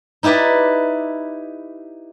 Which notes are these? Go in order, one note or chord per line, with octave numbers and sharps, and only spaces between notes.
D#4 E4 G4 B4 D5